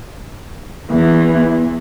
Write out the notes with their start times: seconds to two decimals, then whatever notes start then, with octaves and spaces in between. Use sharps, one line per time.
0.90 E2 E3